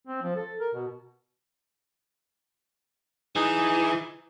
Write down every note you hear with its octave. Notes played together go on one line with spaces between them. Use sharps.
C4
F3
A4
A#4
B2
E3 D#4 G#4